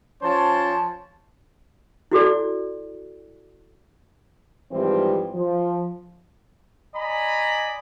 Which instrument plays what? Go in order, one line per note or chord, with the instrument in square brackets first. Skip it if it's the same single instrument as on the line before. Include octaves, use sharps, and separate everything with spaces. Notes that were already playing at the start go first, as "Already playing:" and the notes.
[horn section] F3 C#4 C5 C#5 A5
[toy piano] E4 F#4 A4 D5
[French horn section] G#2 E3 F3 G3 C4 E4
F3
[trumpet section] D5 D#5 G#5 A#5 B5